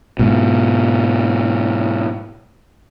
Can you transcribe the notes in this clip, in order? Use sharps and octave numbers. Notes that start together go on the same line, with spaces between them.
G#2 B2